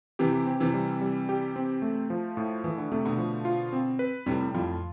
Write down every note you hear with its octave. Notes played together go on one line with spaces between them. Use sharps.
C3 E3 G4
C4
C3 E3
G3
G3
G4
C4
A3
F3
A2
A2 E3
D3
C3 A3
B2 D3
F3
F4
C4
B4
A2 C3 G3
F2 A2 F4